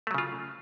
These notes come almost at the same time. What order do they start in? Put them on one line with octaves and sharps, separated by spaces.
A3 F#3 C#3 F4